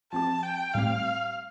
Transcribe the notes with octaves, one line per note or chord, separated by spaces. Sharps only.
F3 C4 G4 A5
G5
A2 G3 C4 G4 F5